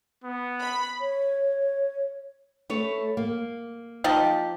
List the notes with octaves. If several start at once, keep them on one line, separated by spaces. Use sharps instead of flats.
B3
B5
C#5
A3 B4 C#5
A#3
F3 D#4 G4